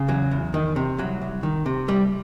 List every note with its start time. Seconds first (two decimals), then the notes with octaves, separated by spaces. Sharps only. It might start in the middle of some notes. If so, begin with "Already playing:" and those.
Already playing: C#3
0.08 E2 F#3
0.31 E2
0.54 D#3
0.76 C3
0.98 C2 F#3
1.22 C2
1.43 D#3
1.66 C3
1.88 C2 G3